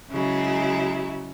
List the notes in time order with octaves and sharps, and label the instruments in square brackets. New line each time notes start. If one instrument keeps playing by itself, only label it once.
[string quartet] C#3 F#3 G#3 E4